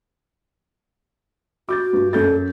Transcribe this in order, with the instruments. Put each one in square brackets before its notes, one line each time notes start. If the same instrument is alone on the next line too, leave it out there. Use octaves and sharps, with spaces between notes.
[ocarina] F#4 [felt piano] D6 G6 A6
[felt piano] G2
[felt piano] F#2 G6 A6 [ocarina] A4